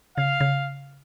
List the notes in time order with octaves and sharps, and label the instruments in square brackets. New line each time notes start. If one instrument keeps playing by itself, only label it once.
[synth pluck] C#3 [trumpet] F5
[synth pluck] C#3